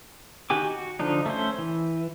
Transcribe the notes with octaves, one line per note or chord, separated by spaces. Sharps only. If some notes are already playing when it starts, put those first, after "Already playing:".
D#3 F#4 G4 G#5 D6
F#4
D3 F3 D4 D#4
A3 C#4 C5
E3